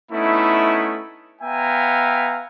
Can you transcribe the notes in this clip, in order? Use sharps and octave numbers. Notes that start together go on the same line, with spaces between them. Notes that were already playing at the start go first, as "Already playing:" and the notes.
A3 B3 C#4 D#4 E4
B3 E5 F5 G5 G#5 A#5